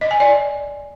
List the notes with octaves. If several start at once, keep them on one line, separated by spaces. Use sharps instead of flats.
D#5
G#5
D5